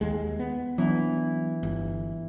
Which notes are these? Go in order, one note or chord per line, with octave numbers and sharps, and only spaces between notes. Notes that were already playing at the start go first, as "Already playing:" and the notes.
D#2 G#3
B3
E3 F#3 B3 D4
G1